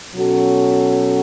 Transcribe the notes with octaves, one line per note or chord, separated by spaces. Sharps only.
B2 F#3 C#4 F#4 A4